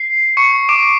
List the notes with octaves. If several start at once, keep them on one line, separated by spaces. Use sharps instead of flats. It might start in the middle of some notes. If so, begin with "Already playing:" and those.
Already playing: C7
C#6 C#7
D6 D7